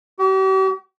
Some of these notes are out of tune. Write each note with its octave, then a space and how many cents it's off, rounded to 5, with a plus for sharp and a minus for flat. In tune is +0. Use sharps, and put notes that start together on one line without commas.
G4 -45